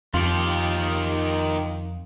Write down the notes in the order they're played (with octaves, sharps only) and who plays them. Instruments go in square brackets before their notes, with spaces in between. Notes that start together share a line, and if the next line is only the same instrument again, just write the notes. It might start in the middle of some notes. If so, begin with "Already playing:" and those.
[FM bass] F2 [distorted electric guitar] D#3 G4 [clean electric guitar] F4